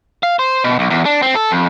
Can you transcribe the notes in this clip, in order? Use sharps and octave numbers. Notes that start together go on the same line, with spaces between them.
F5
C5
B2
B1
E2
D4
C4
A4
F2